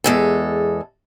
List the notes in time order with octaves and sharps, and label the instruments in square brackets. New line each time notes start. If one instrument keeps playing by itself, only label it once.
[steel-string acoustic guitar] E2 G#3 A4